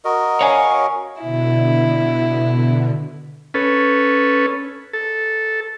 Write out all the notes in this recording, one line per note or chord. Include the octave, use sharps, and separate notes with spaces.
F#4 A#4 D#5
C#5 F5 G#5
B2 D3 E4
C#4 A4 B4
A4